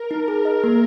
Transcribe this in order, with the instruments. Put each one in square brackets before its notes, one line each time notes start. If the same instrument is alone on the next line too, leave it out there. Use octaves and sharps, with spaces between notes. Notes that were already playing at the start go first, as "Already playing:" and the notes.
Already playing: [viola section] A#4
[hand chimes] D#4
G#4
D#5
A#3